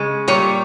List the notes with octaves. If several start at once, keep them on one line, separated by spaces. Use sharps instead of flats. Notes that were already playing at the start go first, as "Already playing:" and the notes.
Already playing: C#3 G#3
A#2 G3 C#5